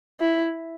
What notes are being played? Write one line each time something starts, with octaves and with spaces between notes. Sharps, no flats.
E4